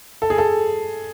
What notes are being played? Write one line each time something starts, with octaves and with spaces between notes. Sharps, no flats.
A4
G#4
A4